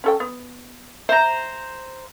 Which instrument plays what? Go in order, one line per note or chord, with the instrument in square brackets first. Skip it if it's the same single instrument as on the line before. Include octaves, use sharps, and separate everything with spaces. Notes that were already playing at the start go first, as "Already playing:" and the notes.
[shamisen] C#4 A4 G5
B3
[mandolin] C5 A#5 [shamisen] E5